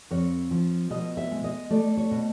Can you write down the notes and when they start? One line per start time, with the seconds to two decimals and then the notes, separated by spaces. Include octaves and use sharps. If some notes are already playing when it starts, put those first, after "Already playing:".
0.11 F2 C#5
0.51 F3
0.91 B2 D#5
1.17 E5
1.31 G#3
1.44 D#5
1.70 A3 D5
1.97 C#5
2.11 B2